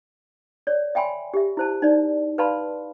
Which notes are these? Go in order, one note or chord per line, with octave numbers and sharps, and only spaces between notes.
C#5 D5
E5 G5 G#5 B5 C6
G4 E5
E4 C5 A5
D#4 D5
B4 D5 F5 A5 B5 C6